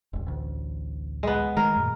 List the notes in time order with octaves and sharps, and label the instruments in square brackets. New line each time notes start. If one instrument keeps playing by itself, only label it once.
[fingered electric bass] E1 A1
A1 D2
[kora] G#3 B3
[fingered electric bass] D#3 G#3 A3 [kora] A#4
[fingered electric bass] F#2 A#2